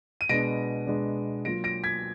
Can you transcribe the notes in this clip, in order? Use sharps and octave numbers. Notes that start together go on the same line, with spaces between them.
D#7
B2 G#3 B3 D4 A#6 D7
B2 G#3 B3 D4
F#3 A#3 F4 A#6 D7
A#6 D7
G#6 B6